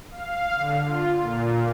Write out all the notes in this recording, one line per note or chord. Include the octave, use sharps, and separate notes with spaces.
F5
D3
F4
A#2